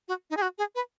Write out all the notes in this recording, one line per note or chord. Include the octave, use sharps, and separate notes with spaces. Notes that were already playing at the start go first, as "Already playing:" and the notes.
F#4
D#4
G#4
F#4
G#4
B4